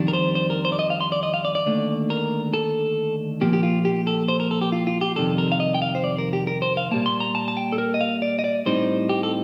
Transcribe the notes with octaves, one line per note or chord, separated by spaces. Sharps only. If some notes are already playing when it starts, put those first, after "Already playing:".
Already playing: F2 D#3 G3 D4
A#4
C5
C5
A#4
C5
D5
D#5
F5
C6
D5
D#5
F5
D5
D5
D#2 D3 A3 D4
A#4
A4
A#2 F3 A#3 G4
G4
F4
G4
A4
C5
A#4
A4
G4
F4
F4
G4
F2 C3 D#3 G3 A4
A#4
F5
D#5
G5
F5
C5
D5
A#4
G4
A#4
C5
F5
A#2 G3 A#3 A5
C6
A#5
A5
A5
G5
A4
A#4
D#5
F5
D5
D#5
D5
A2 G3 C4 D#4 C5
G4
A4